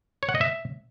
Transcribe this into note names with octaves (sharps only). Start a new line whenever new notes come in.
C#5
F#5
D#5
E5